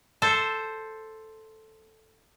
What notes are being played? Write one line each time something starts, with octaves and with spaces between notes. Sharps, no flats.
A4 C5